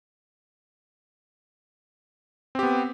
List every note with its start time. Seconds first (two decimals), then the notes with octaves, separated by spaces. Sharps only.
2.55 C4
2.59 G4
2.63 B3